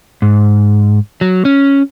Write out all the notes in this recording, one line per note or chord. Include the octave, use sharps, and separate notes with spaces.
G#2
F#3
C#4